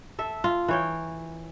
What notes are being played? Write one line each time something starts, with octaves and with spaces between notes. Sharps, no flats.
A4 E5
F4
E3 C#5 G5